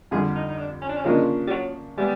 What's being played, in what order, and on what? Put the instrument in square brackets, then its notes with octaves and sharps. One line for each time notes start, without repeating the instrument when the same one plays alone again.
[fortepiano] F2 D3 G3 [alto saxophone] G#4
[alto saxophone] D#4
D#4
D4
C#4
D4
C#4
[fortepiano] C#3 F3 A#3 D4 [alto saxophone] G#3
[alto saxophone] G3
F#3
[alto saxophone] G3 [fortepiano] G#3 B3